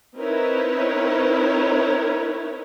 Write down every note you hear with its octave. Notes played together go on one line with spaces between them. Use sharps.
C4 D#4 E4 A#4 B4 C#5